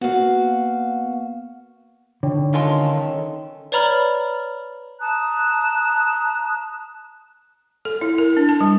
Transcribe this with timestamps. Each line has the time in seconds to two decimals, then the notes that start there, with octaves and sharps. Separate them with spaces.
0.02 A#3 B3 F#4 F5
2.23 D3 D#4 C#5 G5
2.54 D#3 G#3 C#4 F4 A4
3.72 B4 C#5 D5 A#5 B5 F6
5.00 A5 A#5 D#6 F#6
7.85 A4
8.01 E4
8.18 A#4
8.37 D4
8.49 A5
8.61 G3